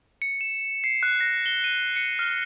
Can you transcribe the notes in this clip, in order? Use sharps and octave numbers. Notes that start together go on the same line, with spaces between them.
C#7
E7
C7
F#6
A#6
G7
D#7
C#7
F6